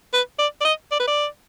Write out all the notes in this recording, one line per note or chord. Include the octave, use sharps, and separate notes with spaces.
B4
D5
D5
D#5
D5
B4
D5